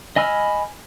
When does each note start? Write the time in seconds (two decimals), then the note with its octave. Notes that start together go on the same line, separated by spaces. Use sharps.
0.16 D#5 G#5 B5 E6 F6